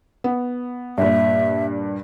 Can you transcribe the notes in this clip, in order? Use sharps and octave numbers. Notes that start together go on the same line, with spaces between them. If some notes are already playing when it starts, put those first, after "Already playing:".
B3
G2 A#2 E5